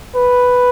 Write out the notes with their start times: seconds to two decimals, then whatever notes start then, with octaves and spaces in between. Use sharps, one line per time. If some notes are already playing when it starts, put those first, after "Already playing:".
0.16 B4